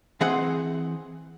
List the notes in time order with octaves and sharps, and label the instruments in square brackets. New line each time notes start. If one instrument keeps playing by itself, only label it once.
[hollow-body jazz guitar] E3 C4 G#4 C5 F#5